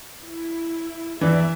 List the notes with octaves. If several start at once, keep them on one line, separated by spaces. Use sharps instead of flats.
E4
E2 E3 D5 E5